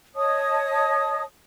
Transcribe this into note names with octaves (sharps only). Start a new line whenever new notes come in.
C#5 D#5 A5 D#6